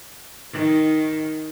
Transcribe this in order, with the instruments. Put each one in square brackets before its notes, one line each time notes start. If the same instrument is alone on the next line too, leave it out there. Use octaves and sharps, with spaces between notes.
[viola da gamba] D#3